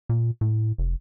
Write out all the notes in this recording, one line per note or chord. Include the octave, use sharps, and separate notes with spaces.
A#2
A2
F1